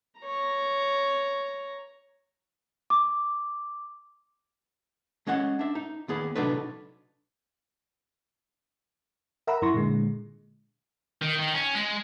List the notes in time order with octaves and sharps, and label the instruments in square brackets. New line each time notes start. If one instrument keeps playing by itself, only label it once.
[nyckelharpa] C#5 A#5
[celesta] D6
[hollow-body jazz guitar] G#3 C#4 D#5 F#5
D4 E5
D#4
D#2 B3 G#4
C3 F#3 D4 D#4 A4 B4
[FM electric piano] A#4 E5 F#5 A#5 B5 E6
F#2 E4 C6 C#6 A#6
A#2 D3 G#3
[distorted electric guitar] D#3
D#3
C#4
G#3